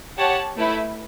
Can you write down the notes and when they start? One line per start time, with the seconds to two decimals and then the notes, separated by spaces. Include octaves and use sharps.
0.17 G4 C#5 F#5 A5
0.57 A3 E4 B4